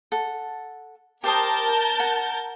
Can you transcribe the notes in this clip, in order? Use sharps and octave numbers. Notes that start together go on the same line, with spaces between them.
A4 F#5
G4 A#4 C5 A5 D#6 G6
F#5